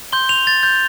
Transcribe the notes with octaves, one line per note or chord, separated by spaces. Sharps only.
C6 G6 G7
F7
A6
G6